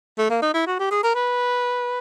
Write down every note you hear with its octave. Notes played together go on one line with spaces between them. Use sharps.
A3
A#3
D#4
E4
F#4
G4
G#4
A#4
B4